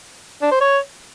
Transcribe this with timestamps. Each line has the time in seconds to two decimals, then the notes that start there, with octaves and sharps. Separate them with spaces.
0.42 D4
0.51 C5
0.61 C#5